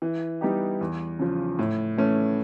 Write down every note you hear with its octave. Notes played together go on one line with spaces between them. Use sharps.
E3
G3 B3 D#4 G4
E2
C#3 F3
A2
E3 A3 C#4